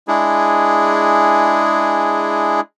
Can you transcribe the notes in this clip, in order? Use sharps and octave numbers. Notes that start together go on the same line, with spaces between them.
G#3 D4 E4 G#4